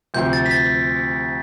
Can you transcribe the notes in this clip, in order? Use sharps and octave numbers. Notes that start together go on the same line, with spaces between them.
D2 C3 F3 C4 G6
A6
B6
A6